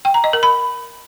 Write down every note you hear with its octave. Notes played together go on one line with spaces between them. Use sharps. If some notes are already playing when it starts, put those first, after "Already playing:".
G5
A#5
D#5
A#4
B5